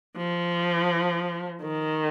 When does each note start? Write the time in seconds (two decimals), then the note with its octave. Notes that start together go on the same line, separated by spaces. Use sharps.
0.17 F3
1.62 D#3